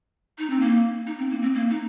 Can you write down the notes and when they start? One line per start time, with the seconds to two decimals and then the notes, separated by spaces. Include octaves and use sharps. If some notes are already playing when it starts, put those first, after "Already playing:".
0.38 D#4
0.50 C4
0.60 A#3
1.07 D#4
1.18 C4
1.31 A#3
1.42 C4
1.55 A#3
1.70 D#4